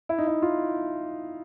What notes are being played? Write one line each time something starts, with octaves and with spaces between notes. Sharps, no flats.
E4
D#4
E4
F4